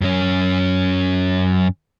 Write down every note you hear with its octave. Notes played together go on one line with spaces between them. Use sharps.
F#2 C#4